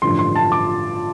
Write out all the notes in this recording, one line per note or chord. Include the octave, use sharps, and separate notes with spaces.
A1 G2 D3 F3 C6
C6
A5
D6